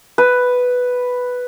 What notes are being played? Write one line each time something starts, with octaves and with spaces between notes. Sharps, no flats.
B4